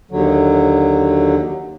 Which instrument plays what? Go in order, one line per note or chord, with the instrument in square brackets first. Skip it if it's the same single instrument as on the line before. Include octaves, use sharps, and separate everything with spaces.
[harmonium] D#2 D3 F#3